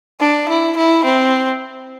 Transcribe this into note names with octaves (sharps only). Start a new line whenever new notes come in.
D4
E4
E4
C4